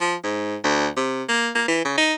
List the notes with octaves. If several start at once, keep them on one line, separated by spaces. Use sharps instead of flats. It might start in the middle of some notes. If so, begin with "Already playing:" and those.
F3
G#2
D2
C3
A#3
A#3
E3
C#3
D#4